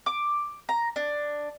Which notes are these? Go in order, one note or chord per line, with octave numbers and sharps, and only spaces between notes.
D6
A#5
D4